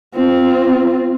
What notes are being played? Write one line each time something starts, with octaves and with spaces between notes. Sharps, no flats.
C4 F4